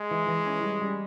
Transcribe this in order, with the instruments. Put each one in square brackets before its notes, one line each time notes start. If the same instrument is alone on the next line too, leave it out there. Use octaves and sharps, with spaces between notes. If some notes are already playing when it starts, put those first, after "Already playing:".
Already playing: [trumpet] G#3
[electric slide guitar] E3
E3
C#4
G3
G3